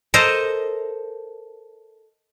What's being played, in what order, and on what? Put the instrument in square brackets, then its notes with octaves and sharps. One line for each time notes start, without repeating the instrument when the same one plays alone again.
[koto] A4 A#4 C5 D#5